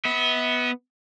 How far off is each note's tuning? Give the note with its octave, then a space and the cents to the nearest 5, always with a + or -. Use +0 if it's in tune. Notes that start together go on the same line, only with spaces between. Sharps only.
B3 +0 E5 -40